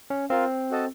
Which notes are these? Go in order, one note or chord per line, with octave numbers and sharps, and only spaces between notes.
C#4
C4 F4 A#4 F5
F#4 A4 D#5 A5